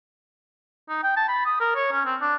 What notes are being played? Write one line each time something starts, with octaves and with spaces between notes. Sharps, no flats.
D#4
G5
A5
B5
D#6
A#4
C#5
C#4
C4
D4